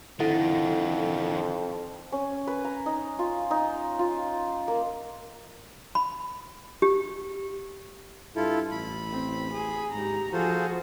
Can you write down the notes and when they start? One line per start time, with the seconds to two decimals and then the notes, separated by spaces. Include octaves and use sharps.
0.20 F2 D3 D#3 E4 A4 F#5
2.12 C#4
2.47 B4
2.64 A#5
2.86 D#4
3.19 F4
3.51 D#4
3.99 F4
4.68 A#3
5.95 B5
6.82 G4
8.36 G2 E4 F4 A4
8.71 A1 B5
9.12 C4
9.51 G#4
9.93 G#2 G4 A#5
10.33 F3 F4 F#4 G#4 A4 C5